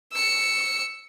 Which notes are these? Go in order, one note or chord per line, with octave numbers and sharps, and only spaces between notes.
E6 C#7